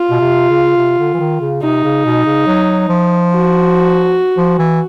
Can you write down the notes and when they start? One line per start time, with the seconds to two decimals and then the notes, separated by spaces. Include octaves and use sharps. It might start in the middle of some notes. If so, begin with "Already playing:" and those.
Already playing: F4
0.11 B2
0.21 C3
0.49 C#3
0.77 C3
0.99 D3
1.14 E3
1.20 D#3
1.41 C#3
1.62 C3 D#4
1.84 C#3
2.05 B2
2.26 C#3
2.47 F#3
2.89 F3
3.32 F#4
4.38 F3
4.59 E3